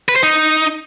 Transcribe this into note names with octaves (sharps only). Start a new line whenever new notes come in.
B4
C5
D#4